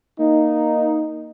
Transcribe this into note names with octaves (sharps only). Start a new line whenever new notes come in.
A#3 D#4